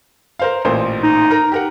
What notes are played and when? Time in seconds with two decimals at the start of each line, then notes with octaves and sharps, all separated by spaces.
0.39 A#4 C5 F5
0.65 A1 A#2 C5
1.03 D#4
1.31 A#4 A#5
1.52 G4 A#4 F#5